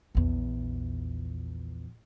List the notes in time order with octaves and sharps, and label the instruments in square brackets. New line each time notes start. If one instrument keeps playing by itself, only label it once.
[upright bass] A#1 E2